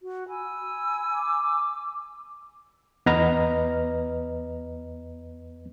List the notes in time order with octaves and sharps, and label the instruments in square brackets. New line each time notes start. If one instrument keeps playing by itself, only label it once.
[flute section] F#4
G#5 B5 E6
[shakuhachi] D6
[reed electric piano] E2 B3 B4 D#5 A#5 F6